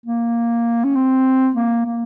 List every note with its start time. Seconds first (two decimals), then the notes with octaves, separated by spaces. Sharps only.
0.06 A#3
0.84 C#4
0.96 C4
1.55 A#3
1.86 A#3